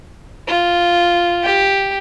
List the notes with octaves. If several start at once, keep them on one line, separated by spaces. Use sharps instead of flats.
F4
G4